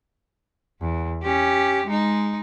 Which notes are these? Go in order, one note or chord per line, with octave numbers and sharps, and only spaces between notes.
E2
C#4 G4
G#3 D#4